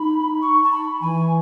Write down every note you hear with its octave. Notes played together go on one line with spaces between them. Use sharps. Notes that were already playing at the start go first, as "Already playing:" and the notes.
Already playing: D#4 B5
C#6
A5
B5
E3 G#5